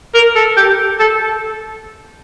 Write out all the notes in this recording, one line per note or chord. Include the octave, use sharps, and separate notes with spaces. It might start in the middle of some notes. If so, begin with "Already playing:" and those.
A#4
A4
G4
A4